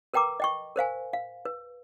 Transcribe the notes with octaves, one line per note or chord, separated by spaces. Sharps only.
A#4 B4 G5 A#5 D6
D#5 G5 C#6
A#4 C5 F5 G#5
F5
B4